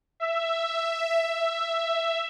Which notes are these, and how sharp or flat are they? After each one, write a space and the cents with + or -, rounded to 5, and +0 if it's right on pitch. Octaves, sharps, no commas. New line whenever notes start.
E5 +10